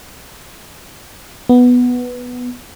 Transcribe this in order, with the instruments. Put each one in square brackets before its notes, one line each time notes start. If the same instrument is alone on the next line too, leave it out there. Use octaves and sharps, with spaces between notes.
[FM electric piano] B3